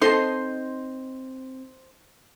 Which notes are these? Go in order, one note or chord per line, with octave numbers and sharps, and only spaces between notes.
C4 D#4 A4 C5 D#5 A5 C6